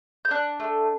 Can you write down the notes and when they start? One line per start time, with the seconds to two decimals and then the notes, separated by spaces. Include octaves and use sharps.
0.25 G6
0.31 D4 F#6
0.60 A3